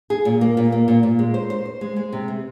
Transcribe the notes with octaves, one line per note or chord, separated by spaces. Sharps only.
G#4
A#2
A#3
A#2
A#3
A#2
A#2
G#3
C5
C5
C5
G#3
G#3
C3
C4